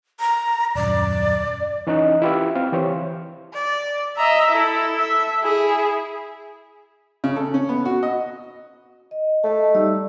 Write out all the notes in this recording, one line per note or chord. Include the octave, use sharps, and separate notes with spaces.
A#5
D#1 F#2 D5
E3 C#4 D#4 D#5 F#6
E4 F4 G4 B4 E5
C4 F5
E3 G4 C5 C#5
D5
D#5 E5 A#5
E4 A4
E5
E4 G#4
C#3
A4
C#4
B3
F#4
D#5
D#5
A3 D#5 A5
G3 D#4 D5 E6